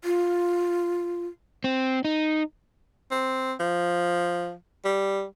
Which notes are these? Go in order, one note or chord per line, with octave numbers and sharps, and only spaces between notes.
F4
C4
D#4
C4
F3
G3